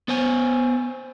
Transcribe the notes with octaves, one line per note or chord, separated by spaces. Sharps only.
B3 C5 G#5